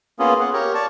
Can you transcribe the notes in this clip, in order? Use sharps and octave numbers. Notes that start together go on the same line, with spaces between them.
A#3 B3 C#4 F4 G#4
G#4 F#5
G4 A#4 C#5
C#5 D5 A5